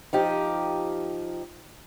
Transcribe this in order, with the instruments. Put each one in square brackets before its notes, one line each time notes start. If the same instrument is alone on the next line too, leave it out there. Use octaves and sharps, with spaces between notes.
[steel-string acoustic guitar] F3 D#4 G4